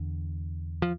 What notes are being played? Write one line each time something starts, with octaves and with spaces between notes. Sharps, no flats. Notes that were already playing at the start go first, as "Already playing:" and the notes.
Already playing: E2 D3
F3